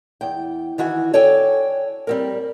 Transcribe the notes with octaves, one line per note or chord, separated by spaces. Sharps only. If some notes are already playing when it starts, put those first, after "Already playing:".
E2 G5
D#3 E3 F#4 G#5
A4 C#5 D5 G5 G#5
G3 C4 A#4